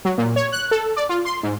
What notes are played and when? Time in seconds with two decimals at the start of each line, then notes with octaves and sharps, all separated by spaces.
0.05 F#3
0.18 A#2
0.36 C#5
0.52 F#6
0.71 A4
0.97 D5
1.09 F4
1.25 C6
1.43 G#2